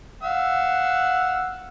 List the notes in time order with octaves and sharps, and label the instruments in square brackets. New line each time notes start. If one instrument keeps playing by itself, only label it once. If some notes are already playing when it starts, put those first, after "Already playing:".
[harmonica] F5 E6 [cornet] F#5